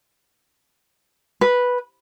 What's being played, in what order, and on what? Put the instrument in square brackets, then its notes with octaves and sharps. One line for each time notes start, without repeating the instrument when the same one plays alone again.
[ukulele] B4